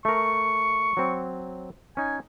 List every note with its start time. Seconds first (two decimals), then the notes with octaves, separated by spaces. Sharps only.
0.05 A3 A#4 C#6
0.97 F#3 C4
1.97 C#4 D#4 G#5